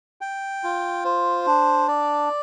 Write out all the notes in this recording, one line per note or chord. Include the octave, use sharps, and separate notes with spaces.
G5
F4
C5
D4
D5